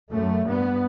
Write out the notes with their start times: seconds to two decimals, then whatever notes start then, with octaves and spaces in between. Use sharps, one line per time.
0.11 F#2 A3
0.46 G2 B3